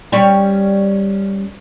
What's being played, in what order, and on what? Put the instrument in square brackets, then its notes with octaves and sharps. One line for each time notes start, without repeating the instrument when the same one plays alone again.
[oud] G3 C#4 C#5